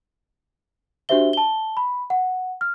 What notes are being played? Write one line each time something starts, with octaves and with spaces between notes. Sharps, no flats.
D4 F#4 G4 C5 E5 G7
A5 G7
B5
F#5
F6